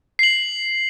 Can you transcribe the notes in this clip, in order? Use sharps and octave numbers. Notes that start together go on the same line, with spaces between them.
C7 F#7